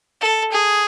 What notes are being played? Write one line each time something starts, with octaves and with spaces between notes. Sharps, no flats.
A4
G#4